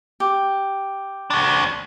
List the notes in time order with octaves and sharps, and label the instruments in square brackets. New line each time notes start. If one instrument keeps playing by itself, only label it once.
[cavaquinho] G4
[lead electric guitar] D4 F#4